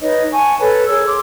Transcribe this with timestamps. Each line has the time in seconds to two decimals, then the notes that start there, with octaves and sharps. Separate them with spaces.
0.01 D#4 B4 C#5 D#5
0.33 F#5 G#5 A5 C#6
0.60 A4 B4 C#5
0.88 G#4 A#4 C#5 E6
1.07 C6 D6